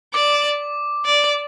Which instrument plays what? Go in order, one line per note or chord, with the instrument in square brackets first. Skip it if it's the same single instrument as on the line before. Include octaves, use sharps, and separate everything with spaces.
[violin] D5 [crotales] D6
[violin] D5